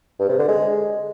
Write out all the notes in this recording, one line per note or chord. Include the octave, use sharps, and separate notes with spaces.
G2
C3
D3
G#3